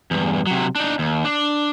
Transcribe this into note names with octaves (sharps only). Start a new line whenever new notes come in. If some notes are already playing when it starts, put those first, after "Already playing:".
E2 G2
C3 F#3
D4 D#4
D#2
D4